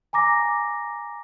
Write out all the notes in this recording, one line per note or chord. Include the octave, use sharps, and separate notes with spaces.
G#5 A#5 D6 A#6